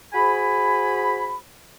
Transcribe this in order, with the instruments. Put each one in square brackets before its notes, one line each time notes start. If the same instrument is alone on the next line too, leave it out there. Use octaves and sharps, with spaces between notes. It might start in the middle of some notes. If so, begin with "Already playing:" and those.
[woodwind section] F#4 G#4 C5 G#5 B5